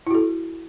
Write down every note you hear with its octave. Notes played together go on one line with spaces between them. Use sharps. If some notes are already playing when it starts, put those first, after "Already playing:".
E4 F#4 A4